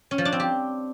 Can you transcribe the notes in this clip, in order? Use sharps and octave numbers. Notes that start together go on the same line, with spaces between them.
C#4
F3
D4
C4
G4